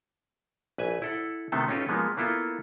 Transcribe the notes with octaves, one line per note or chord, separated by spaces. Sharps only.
A#1 B4 E5 G#5
E4 A4 F#5
C3 D#3 A3 B3 C4 A4
C#4 D#4 F4 G4 A4 B4
F3 G#3 A#3 B3
A#3 B3 E4 F4 A4